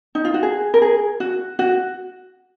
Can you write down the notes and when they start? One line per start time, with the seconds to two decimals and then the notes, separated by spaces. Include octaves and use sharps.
0.15 D#4
0.25 F4
0.34 F#4
0.43 G#4
0.74 A#4
0.82 G#4
1.20 F#4
1.59 F#4